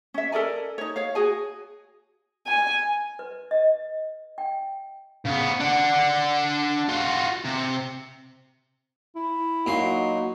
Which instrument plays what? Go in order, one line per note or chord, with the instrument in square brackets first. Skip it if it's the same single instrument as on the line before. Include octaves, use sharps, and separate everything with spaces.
[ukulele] C#4 E5
A4 A#4 D5 G#5
D#4 C#5
C#5 F5
F#4 G#4 G#5
[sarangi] G#5
[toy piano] B4
D#5
G5
[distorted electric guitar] C#3 B3
D4 F#5
F4 F#4
C3
[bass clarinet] E4
[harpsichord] A#2 C6 [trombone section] F#3 D#4 F#4